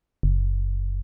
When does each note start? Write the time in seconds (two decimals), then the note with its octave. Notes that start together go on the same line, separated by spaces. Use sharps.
0.23 F#1